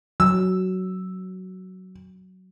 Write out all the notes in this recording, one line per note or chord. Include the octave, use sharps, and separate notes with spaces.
F#3 E6